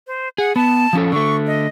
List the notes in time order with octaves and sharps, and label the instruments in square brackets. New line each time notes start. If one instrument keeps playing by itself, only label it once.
[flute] C5
[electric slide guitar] G#4 [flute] F#5
[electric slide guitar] B3 [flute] A5
[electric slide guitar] F3 C#4 A4
[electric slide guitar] D3 A3 [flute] C#6
[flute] D#5